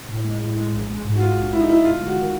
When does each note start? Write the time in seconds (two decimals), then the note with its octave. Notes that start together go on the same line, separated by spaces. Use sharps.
0.09 A2
0.24 G#3
0.41 A2
0.57 G#3
0.73 A#1
0.89 G#3
1.04 G#2
1.16 F#4
1.20 G#3 F4
1.37 A#1
1.53 G#3 E4
1.60 D#4
1.68 G#3 E4
1.85 G1 F4
2.01 G#3
2.06 F#4
2.17 D#3